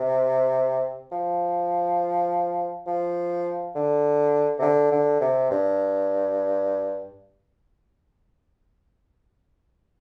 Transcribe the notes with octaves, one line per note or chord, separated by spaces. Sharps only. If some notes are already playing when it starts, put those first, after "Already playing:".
Already playing: C3
F3
F3
D3
C3
D3
D3
C3
G2